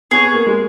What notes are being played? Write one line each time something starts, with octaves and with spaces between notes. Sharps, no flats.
B3 G#4 C#5
A#3
G#3